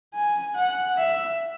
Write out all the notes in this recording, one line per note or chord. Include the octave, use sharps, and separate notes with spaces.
G#5
F#5
E5